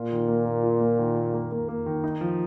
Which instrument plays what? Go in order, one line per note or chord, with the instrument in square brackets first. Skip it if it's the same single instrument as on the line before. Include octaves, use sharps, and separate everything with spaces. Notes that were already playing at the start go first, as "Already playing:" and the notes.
Already playing: [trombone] A#2 [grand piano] F4
[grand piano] D#3
A#3
A#3
F4
A#3
D#3
A#3
A#3
A#3
A#3
D#3
D#4
F3